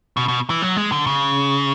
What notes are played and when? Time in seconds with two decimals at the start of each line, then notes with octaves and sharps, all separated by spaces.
0.17 B2
0.28 B2
0.50 E3
0.62 F#3
0.77 G#3
0.92 D3
1.07 C#3